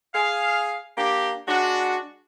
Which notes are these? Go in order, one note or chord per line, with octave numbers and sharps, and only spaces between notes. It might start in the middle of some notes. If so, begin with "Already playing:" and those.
G#4 F5
A#3 D4 G4
G#3 D4 F#4